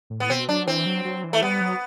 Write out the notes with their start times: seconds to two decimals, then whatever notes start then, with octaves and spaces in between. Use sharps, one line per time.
0.10 A2
0.20 B3
0.29 B2 C4
0.48 F#3 D4
0.67 E3 C4
0.86 F#3
1.05 F#3
1.24 E3
1.33 A3
1.42 G3 B3
1.61 F#3